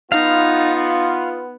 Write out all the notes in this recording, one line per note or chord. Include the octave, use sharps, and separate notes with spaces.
B3 D#4 F4 F5